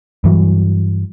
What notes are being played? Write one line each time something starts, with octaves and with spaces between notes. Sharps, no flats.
G2 E3 F#3